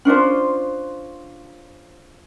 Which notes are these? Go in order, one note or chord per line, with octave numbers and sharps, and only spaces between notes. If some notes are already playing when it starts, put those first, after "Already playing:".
C#4 D4 F4 C5